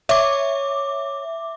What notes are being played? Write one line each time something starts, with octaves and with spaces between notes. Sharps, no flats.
C#5 E5 D6